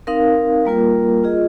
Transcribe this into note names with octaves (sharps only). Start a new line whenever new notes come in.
C4 D#4 A#4 F5
G3 A#3 F4 A#4
F4 G#4 D#5